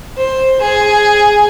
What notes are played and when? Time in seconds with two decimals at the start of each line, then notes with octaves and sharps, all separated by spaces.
0.17 C5
0.61 G#4